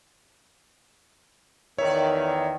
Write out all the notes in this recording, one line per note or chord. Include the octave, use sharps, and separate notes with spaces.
E2 D#3 C#5 D5 E5